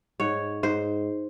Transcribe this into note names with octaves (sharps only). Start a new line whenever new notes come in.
G#2 C#5
G#2 C5